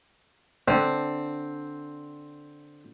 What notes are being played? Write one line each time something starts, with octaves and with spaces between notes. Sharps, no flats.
D3 C4